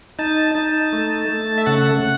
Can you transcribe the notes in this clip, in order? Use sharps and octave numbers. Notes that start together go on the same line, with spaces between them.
D#4 A5
D#4
A3
A3
E5
C#3 F#5